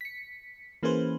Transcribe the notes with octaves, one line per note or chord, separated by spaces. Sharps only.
B6 C#7
E3 A#3 C#4 G#4 B4 C5